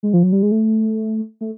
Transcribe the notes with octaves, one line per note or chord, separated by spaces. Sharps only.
G#3
F3
F#3
G3
G#3
A3
A3